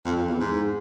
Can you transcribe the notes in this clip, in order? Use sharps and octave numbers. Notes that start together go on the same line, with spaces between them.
F2
F2
E2
G#2